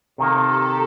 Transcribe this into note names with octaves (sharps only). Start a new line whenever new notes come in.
C3 D#3 A#3 A4
G4